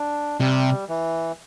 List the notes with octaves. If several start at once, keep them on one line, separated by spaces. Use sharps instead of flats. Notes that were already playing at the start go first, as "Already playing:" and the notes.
Already playing: D4
C3 G3
E3